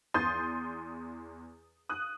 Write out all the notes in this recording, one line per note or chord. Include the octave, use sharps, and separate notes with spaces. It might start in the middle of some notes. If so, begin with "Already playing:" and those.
E2 C6 D#6 G6 A6
D#6 F#6